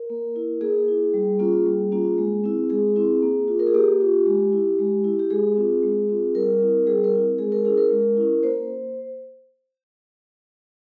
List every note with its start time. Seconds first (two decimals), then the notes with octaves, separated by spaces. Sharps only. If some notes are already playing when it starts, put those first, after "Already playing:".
Already playing: A#4
0.10 A#3
0.36 E4
0.61 A#3 G#4
0.88 E4
1.14 G3
1.39 A#3 C#4 F4
1.66 G3
1.92 A#3 C#4 F4
2.18 G#3
2.44 C4 E4
2.70 G#3 G#4
2.96 C4 E4
3.23 A#3
3.48 F4
3.59 A#4
3.67 G#4
3.74 A#3 G4
4.01 F4
4.26 G#3
4.53 E4
4.79 G#3
5.04 E4
5.19 G4
5.30 G#3 G#4
5.57 C4 F4
5.83 G#3
6.09 C4 F4
6.35 G3 A#4
6.60 C4 E4
6.87 G3 G#4
7.04 A#4
7.13 C4 E4
7.39 G#3 G#4
7.52 A#4
7.65 C#4 E4 G#4
7.78 A#4
7.91 G#3
8.17 C#4 E4
8.43 A#3 C5